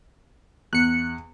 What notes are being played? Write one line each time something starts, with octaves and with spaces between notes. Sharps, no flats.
E2 F#6 C#7